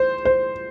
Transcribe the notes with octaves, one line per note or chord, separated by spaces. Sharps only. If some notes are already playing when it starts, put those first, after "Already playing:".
Already playing: C5
C5